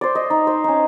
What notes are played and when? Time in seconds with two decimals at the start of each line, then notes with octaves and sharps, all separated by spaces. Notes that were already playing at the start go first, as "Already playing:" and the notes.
0.01 C5 D5
0.15 D#5
0.30 D#4
0.47 C5
0.64 C#4 D#4